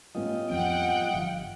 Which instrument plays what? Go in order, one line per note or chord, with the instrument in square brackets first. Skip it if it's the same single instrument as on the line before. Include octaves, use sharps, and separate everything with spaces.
[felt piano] A2 B3 C#4 [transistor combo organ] G3 F4 D#5
[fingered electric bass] F2 F3 C4 [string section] F#5 G5
[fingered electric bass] G1 F3 [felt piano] F5